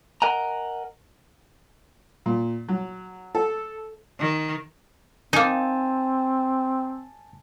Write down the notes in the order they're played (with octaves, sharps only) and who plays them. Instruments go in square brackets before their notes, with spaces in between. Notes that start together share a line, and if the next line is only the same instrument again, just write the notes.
[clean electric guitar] A#4 D#5 F#5 G#5 A#5
[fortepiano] A#2
F#3
A4
[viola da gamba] D#3
[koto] A#3 D#4 [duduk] C4 [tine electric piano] G#5 A5